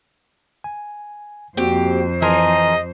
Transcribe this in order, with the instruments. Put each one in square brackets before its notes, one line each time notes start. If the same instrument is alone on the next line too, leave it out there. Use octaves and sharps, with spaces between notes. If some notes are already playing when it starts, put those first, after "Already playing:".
[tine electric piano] G#5
[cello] F2 C5 [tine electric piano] A#3 F#4 [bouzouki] C4 G4
[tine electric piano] E3 A5 C6 [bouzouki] D#4 G#4 A#4 [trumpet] D#5